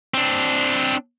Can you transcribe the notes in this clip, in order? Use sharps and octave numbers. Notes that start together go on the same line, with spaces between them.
C4 D4